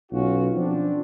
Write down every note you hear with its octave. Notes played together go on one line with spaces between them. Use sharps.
B1 C#4 F4 F#4
F3 C4 D4